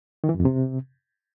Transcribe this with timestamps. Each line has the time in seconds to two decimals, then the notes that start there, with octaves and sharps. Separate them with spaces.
0.24 D#3
0.29 E3
0.34 F#2
0.40 F2
0.45 C3